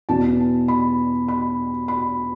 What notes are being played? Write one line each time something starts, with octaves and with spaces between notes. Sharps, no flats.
E2 B2 A5
B5
B5
B5